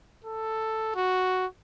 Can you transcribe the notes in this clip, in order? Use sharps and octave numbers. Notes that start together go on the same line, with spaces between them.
A4
F#4